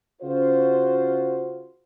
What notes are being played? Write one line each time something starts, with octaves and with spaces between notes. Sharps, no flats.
C#3 F4 F#4 C5